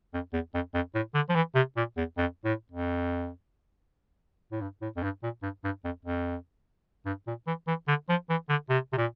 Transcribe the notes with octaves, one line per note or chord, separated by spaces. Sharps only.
F2
E2
F2
F2
A2
D3
F3
E3
C3
A#2
E2
F2
A2
F2
A2
G2
A2
F2
G2
A#2
G2
G2
F2
F2
G2
A#2
E3
E3
D3
F3
E3
D3
C3
C3
A#2